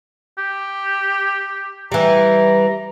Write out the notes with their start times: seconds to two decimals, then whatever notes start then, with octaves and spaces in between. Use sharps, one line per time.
0.38 G4
1.92 E3 G3 A#5